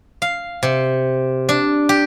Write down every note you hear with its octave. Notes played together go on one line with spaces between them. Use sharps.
F5
C3
D4
G4